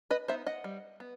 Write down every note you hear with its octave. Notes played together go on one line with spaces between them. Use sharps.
B4 D#5
B3 D#4 C5 E5
D#5 F#5
G3
B3